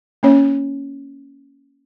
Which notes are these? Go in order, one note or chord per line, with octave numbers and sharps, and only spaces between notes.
A#3 C#4 C#5